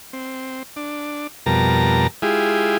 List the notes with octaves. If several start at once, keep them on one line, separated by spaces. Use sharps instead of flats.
C4
D4
F2 B2 G3 A#4 A5 A#5
G#3 E4 F4 G4 G#4